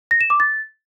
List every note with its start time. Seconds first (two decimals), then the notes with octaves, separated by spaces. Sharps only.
0.11 A#6
0.21 E7
0.30 D6
0.40 A6